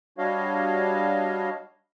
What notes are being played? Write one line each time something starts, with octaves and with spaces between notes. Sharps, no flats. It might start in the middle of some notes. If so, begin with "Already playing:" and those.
G3 D4 F#4 C#5 D#5 F5